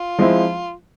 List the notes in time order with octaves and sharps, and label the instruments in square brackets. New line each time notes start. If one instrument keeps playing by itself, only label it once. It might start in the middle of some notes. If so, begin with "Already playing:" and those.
Already playing: [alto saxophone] F4
[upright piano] F3 G#3 C4 E4